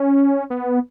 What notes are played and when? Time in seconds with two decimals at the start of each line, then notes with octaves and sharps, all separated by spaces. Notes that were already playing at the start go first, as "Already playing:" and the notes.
Already playing: C#4
0.50 B3